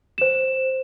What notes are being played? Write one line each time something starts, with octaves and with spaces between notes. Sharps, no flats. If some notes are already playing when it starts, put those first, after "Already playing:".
C5 E7